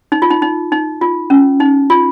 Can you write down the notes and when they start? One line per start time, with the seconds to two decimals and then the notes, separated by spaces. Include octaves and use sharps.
0.12 D#4
0.22 F4
0.31 D#4
0.42 D#4
0.72 D#4
1.01 F4
1.30 C#4
1.60 D#4
1.90 F4